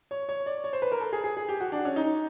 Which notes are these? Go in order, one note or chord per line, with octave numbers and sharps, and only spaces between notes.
C#5
C#5
D5
C#5
C5
B4
A#4
A4
G#4
G#4
G#4
G4
F#4
D4
C#4
D#4